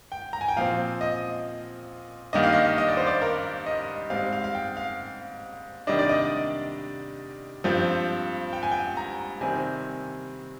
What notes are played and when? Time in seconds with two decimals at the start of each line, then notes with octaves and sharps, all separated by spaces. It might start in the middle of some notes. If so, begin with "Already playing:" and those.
0.12 G5
0.33 A#5
0.41 G#5
0.48 G5
0.57 A#2 F3 C4 F5
1.01 D#5
2.33 G2 D#3 A#3 D4 D#5
2.43 F5
2.53 D#5
2.78 D#5
2.88 D5
2.97 C5
3.06 D5
3.22 A#4
3.66 D#5
4.10 G#2 G3 C4 F5
4.33 F5
4.44 F5
4.55 G5
4.77 F5
5.87 C3 D#3 G3 D4 D#5
5.99 D5
6.09 D#5
7.64 G2 F3 C4
8.53 G5
8.63 G#5
8.71 G5
8.97 A#5
9.41 C3 D#3 G3 C4 G#5